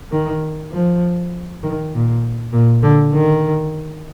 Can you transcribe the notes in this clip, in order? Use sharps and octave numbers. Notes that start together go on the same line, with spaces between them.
D#3
F3
D#3
A#2
A#2
D3
D#3